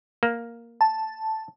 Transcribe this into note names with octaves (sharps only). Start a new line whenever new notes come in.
A#3
A5